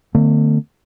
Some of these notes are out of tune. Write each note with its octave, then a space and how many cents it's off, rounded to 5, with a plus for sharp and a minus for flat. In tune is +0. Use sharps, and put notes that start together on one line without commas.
D3 +35 A3 +40 C4 -45